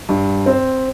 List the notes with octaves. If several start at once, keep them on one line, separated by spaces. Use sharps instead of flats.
G2
C4